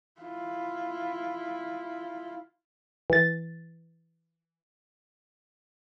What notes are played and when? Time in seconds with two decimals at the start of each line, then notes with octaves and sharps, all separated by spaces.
0.21 E4 F4
3.10 E3 A6